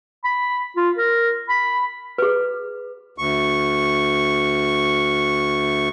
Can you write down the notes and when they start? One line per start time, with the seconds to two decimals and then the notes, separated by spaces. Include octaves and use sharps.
0.24 B5
0.77 F4
0.97 A#4
1.49 B5
2.18 G#4 B4
3.18 D2 C#6